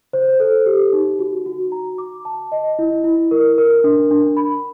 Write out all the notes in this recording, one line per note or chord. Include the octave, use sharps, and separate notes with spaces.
C5
A4
G4
D#4
F#4
F#4
A#5
D6
A5
D#5
E4
E4
A#4
A#4
D4
D4
B5